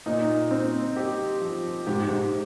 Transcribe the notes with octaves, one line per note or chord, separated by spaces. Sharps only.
A#2 D#4
C4
G4
F3
G#2 G4
G#2